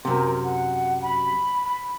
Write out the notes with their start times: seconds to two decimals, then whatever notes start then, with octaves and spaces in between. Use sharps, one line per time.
0.05 F#2 C3 A#4
0.44 F#5
1.02 B5
1.64 B5